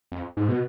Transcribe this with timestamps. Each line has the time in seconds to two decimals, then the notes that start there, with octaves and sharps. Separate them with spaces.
0.12 F2
0.37 G#2
0.48 B2